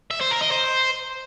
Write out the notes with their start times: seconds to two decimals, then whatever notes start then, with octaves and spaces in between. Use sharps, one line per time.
0.11 E5
0.21 C5
0.31 A#4
0.42 D#5
0.52 C5